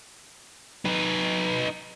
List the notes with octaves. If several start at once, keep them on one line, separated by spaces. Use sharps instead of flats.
D#4 B4